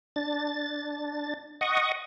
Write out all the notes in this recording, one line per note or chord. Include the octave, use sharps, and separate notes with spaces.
D4 A6
D#5 F#5 C#6 D#6